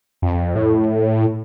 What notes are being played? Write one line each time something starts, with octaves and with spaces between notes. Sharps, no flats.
F2
A2